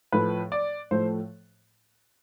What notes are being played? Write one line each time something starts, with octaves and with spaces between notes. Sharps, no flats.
A2 F3 A3 B4
D5
A2 F3 A3 C5